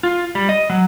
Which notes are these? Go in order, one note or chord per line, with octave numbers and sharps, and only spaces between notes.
F4
G3
D#5
F#3